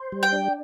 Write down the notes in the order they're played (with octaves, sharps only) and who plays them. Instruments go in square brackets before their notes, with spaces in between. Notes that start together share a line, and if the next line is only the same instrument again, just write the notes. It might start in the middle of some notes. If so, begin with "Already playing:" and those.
Already playing: [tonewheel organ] C5
G3
[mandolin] G5
[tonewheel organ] D4